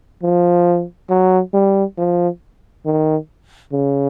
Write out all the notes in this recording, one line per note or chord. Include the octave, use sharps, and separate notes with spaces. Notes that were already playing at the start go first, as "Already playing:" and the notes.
F3
F#3
G3
F3
D#3
C#3